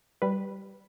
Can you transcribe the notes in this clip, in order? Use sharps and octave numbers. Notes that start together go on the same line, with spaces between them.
G3 B4